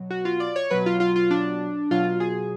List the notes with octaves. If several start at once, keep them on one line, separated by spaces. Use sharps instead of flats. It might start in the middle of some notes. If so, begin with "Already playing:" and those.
Already playing: B2 F#3
F#4
F4
D5
C#5
B2 F#3 B4
F4
F4
F4
D4
B2 F#3 F4
G#4